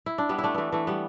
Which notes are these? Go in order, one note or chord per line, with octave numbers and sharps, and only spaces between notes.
E4
D4
G3 B3
E4
A3 D4
E3 A3 B3
E3 A3
G3 B3